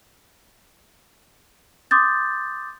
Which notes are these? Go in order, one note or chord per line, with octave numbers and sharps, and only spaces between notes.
C6 D6 D#6 G6 A6